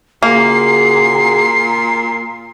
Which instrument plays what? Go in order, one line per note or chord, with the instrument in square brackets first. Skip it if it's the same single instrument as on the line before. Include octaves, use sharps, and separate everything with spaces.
[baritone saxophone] A#2 [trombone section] C#3 F#4 G#4 [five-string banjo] A#3 [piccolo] C7